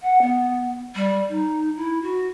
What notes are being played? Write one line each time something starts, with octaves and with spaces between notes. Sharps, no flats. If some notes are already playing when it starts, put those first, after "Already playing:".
F#5
B3
G3
D#4
E4
F#4